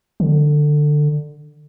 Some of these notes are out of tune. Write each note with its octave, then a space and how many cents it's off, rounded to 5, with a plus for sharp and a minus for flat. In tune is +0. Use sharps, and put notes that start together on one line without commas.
D3 +15